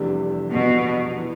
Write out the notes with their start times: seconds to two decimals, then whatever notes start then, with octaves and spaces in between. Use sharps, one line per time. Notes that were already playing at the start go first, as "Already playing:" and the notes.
Already playing: F1 E2 C3 G3 D4
0.52 B2
1.16 E3